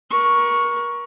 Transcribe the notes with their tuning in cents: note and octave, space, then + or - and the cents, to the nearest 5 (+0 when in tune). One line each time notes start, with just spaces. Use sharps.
A#4 +35 C#6 +0